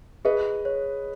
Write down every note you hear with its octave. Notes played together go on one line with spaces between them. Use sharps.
G#4 B4 D#5
C#5